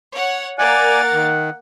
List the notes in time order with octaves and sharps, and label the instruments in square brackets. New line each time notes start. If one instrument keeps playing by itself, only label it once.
[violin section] C#5 F#5
[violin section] A#3 A#4 A6 [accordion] D5 G#5 [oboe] F#5
[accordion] D#3